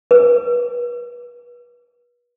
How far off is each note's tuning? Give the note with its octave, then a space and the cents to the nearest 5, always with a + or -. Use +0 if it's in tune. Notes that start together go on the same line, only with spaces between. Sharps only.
B4 -35